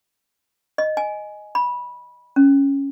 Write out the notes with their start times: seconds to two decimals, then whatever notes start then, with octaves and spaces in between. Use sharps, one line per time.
0.78 D#5
0.97 G#5
1.55 B5
2.36 C#4